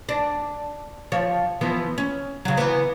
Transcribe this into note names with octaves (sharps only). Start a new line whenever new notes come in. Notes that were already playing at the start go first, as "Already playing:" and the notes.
D4
F3 C#5
E3 F3 B3
C#4
C#3 F#3
E3 B3